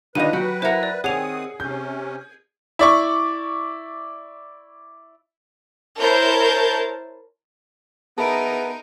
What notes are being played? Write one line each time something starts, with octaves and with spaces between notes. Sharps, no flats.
D3 D#3 G3 F4 B4 D#5 D#7
F#3 F#4 G5
E4 A#4 C5 E5 F#5
D5
D#3 C4 G#4 C#5 F#5 G#5 D#6 F7
C3 C#4 G6
E4 D5 C#6
E4 A#4 C5 C#5 A5 G6
B3 D#4 G#4 A#4 E5 A5 B5 D7